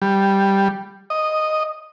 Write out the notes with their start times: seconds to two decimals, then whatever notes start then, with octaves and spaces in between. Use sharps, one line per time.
0.02 G3
1.10 D#5